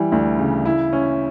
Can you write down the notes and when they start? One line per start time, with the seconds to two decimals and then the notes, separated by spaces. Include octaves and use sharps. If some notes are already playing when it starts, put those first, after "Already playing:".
Already playing: E3 G3
0.12 D2
0.38 C#3
0.65 E4
0.93 C#4